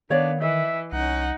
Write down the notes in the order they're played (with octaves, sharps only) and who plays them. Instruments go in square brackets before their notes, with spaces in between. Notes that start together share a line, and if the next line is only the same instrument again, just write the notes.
[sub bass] D#3 [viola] B3 [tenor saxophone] D4 [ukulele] C#5 D5 F5
[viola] E3 [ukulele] D#5 [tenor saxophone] E5
[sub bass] C2 [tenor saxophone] C#4 [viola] D#4 F#5